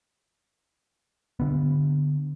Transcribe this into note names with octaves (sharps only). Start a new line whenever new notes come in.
D3 B3